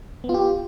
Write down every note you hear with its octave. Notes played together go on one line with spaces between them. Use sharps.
B3
F4
G4